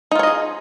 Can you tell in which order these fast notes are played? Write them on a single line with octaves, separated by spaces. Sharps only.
D#4 F4 C#5 D#5 G#4